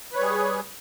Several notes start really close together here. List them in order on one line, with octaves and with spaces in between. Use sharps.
B4 C#5 G3 G#4